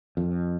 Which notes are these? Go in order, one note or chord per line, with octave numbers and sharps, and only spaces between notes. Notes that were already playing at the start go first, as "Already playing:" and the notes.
F2